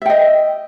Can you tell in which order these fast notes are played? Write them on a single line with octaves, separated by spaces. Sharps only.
E5 G5 D#5